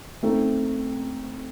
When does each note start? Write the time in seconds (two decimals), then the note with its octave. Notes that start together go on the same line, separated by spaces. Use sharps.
0.23 A3 C4 D#4